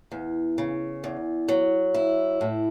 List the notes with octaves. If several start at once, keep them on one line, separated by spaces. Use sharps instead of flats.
E2
C#3
E2
F#3
E4
A2